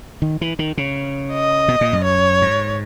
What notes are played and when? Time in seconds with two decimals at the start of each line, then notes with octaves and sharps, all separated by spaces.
0.22 D#3
0.41 E3
0.59 D#3
0.77 C#3
1.33 D#5
1.68 B2
1.81 A#2
1.93 F#2
2.05 C#5
2.42 G#2